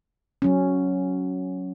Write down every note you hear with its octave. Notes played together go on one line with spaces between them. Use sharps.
F#3 C#4